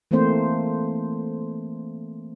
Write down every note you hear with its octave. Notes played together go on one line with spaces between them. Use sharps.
E3 A3 A#3 C4 C5